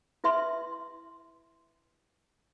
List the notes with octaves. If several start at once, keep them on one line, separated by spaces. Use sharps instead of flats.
E4 B4 E5 C6